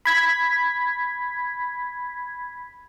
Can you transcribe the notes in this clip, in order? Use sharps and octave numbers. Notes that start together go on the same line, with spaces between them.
B5 G#6 B6